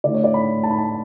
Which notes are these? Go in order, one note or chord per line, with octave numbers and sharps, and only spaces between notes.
D3 A3 E4 D5
C#5
D5
B5
A5
B5
A5